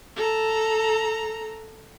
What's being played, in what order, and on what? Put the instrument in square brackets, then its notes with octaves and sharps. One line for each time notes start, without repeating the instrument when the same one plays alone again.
[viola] A4 A#5